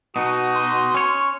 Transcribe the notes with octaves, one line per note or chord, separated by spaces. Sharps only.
B2 D#4 F#4 D#6
C6
C#4 C#5